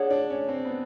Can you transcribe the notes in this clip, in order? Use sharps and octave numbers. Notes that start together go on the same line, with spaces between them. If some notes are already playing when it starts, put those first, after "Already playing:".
Already playing: D4 G#4 C#5 F#5
D4
C#4
C4
B3